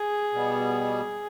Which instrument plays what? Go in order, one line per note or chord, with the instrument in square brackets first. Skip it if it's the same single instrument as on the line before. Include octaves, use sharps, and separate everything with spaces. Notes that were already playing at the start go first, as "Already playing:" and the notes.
Already playing: [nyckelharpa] G#4
[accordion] B2 G3 B3